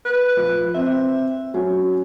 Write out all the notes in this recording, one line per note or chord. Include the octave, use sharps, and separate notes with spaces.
B4
F3
C4 E5
F#3 C#4